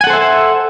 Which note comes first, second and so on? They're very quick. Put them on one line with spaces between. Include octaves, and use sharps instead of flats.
G#5 F#5 A4 C5 E5